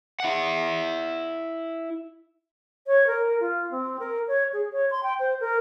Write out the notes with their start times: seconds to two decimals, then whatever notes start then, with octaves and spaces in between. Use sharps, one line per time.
0.20 E4 F#5
2.87 C#5
3.07 A#4
3.40 F4
3.71 C4
4.00 A#4
4.28 C#5
4.53 G#4
4.72 C#5
4.91 C6
5.03 G5
5.20 C5
5.40 A#4